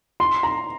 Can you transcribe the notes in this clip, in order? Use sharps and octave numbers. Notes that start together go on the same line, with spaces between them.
C6
A#5